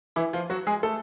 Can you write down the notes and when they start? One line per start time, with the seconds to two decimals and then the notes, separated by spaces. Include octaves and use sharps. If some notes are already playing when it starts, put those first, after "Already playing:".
0.16 E3 E4
0.33 F3 F4
0.50 F#3 F#4
0.67 G#3 G#4
0.83 A3 A4